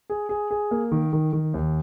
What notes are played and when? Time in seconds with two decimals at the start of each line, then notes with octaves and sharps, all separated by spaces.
0.10 G#4
0.29 G#4
0.51 G#4
0.71 A#3
0.92 D#3
1.13 D#3
1.33 D#3
1.54 D#2